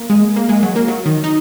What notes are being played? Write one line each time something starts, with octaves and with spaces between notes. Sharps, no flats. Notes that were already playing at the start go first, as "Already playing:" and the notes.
Already playing: A#3
G#3
A#3
G#3
F#3
A#3
F#3
D#3
D#4